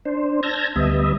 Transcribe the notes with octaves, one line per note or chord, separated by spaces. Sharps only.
D4 C5
A5 E6 F6 G6 G#6 A#6
D2 G3 B3 D#5 E5